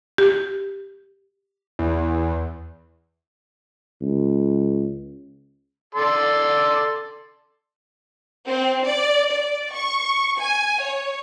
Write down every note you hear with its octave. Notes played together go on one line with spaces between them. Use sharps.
G4
E2
C#2
A4 D5 C6
C4
D5
D5
C#6
G#5
C#5